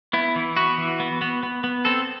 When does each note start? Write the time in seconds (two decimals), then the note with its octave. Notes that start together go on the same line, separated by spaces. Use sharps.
0.13 B3 E4
0.36 E3
0.57 B3 F#4
0.78 E3
1.00 B3
1.21 B3
1.43 B3
1.64 B3
1.85 C4 A4